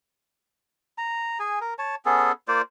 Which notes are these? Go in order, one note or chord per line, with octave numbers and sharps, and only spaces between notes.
A#5
G#4 G#5
A#4
C#5 A5
B3 C#4 G#4 A4
A#3 F4 C5 D5